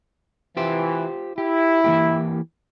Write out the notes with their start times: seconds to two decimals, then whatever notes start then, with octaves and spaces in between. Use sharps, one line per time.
0.57 E3 F4 G4 C5
1.38 E4 G4
1.84 E3 A#3 G4